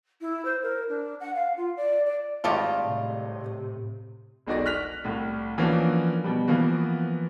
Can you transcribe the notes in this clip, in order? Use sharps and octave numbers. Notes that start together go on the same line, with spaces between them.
E4
C5
A#4
D4
F#5
F5
F4
D5
D5
G#1 G3 A3 F4 D#5 F5
A2 C3
E1 B1 D#4 F#4 D5 A#6
F6 F#6 B6 F7
C2 A2
E3 F3 A#3 C#4 D4 F#4
B2 G3
E3 F3 A#3 B3 F#4